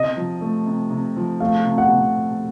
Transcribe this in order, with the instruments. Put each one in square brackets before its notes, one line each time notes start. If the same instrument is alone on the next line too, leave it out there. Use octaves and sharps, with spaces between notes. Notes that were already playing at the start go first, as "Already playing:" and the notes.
Already playing: [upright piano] C3 [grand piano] D#5
[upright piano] F3
A3
C3
C3
F3
[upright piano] A3 [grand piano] F5
[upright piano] C3
[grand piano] F#5
[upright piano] C3